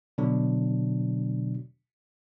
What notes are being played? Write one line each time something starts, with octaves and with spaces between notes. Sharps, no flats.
B2 D3 F#3 D4